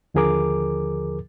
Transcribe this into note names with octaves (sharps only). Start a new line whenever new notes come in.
D#2 D3 F3 G#4 A#4 D6